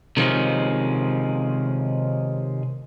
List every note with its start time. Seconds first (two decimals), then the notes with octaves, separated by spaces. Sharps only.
0.17 C3 D#3 F3 G#3 C#4